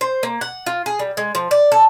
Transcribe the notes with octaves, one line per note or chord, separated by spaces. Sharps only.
C5
A#3
F#5
F4
G#4
G3
G#3
F3
D5
A4